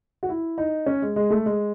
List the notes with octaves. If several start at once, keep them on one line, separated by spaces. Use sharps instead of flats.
F#4
E4
D#4
C#4
G#3
G#3
A3
G#3